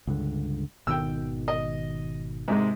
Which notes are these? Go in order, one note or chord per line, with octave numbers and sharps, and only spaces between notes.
C#2 G2 D3
G#1 B2 D#3 G5 E6
D#5
G#2 C3 G#3